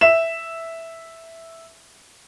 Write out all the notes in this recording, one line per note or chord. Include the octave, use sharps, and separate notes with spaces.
E5 E7